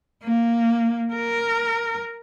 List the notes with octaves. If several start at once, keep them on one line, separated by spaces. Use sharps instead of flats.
A#3
A#4